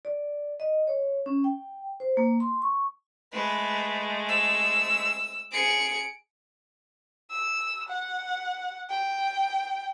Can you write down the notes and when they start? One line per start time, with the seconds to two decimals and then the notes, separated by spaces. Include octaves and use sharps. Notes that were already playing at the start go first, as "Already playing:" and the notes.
0.05 D5
0.60 D#5
0.87 C#5
1.26 C#4
1.44 G5
2.00 C5
2.17 A#3
2.40 C6
2.62 C#6
3.33 G#3 A3 B4
4.29 E6
5.52 G#4 C#7 D7
7.31 E6
7.89 F#5
8.90 G5